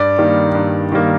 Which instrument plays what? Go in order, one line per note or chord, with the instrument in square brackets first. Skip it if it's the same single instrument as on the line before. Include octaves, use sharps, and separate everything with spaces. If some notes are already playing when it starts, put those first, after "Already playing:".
Already playing: [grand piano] G2 D5
D#3 G3 A#3
G2
D#3 G3 A#3